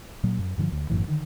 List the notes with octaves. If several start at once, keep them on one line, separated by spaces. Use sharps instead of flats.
A#2 F#3
F#2
G2 D3 D#3 F3
D2
G1 F#2 A2 E3
D3 D#3